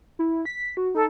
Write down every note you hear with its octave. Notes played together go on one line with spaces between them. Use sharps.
E4
B6
F#4
D#4 A4